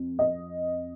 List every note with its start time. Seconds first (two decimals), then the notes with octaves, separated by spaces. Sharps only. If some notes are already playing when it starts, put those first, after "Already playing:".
Already playing: F2
0.19 D#5